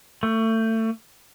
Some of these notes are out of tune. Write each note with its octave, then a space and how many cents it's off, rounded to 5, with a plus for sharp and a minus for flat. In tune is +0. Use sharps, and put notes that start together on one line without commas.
A3 +30